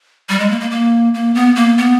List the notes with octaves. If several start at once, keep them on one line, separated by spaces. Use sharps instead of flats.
G3
G#3
A#3
A#3
A#3
A#3
B3
A#3
B3